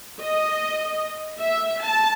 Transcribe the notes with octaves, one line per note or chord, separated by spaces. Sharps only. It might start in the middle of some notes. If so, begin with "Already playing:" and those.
D#5
E5
A5